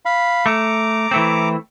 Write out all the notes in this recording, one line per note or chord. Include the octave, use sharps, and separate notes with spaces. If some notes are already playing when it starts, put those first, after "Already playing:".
F5 B5
A3 A#5 D6
E3 A3 C4